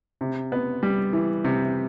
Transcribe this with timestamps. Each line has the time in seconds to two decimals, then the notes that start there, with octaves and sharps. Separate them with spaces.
0.21 C3
0.52 B3
0.83 G3
1.13 E3
1.44 C3